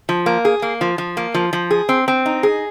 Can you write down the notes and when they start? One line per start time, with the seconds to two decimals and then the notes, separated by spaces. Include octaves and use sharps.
0.09 F3
0.26 A#3
0.45 G#4
0.62 A#3
0.81 F3
0.98 F3
1.17 A#3
1.34 F3
1.53 F3
1.71 G#4
1.89 C4
2.08 C4
2.26 D#4
2.43 G#4